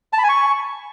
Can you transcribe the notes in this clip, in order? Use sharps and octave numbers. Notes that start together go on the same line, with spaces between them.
A5
B5
G#5
C#6